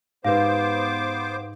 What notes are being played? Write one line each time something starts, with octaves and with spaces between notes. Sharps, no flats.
G#2 B3 G4 B4 C5 F5 D6